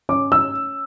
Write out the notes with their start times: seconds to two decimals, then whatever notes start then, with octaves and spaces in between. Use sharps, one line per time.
0.09 C#4 D6
0.32 E6